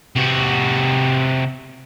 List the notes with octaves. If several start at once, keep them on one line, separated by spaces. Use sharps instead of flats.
C3 F#4